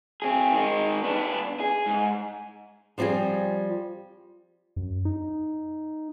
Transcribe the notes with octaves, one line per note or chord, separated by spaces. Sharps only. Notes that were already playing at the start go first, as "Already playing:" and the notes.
C4 G#4
D#3 G#3
B3 D4
G#4
G#2
F3 G3 C4 F4 G#4
F#2
D#4